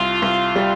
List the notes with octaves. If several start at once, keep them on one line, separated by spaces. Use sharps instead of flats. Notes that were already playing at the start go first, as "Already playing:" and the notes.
Already playing: C2 F4
C2
G3